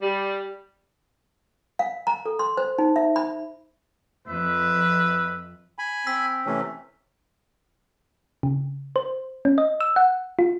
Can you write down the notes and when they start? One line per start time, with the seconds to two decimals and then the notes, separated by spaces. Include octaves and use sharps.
0.02 G3
1.79 F5
2.07 A#5
2.26 A4
2.39 C6
2.57 C5
2.78 D#4
2.96 E5
3.16 B5
4.28 F2 B4 E5
5.79 G#5 B5
6.07 C4 E6 B6
6.46 C3 E3 A3 C#4
8.43 C#3
8.96 C5
9.45 C#4
9.58 D#5
9.80 E6
9.96 F#5
10.39 F4